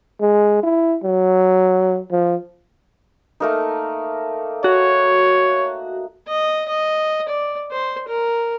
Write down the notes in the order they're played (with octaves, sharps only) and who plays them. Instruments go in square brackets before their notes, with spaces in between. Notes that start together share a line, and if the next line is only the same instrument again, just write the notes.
[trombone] G#3
E4
F#3
F3
[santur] A3 A#3 D#4
[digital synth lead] F#4 [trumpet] C#5
[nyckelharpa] D#5
D#5
D5
C5
A#4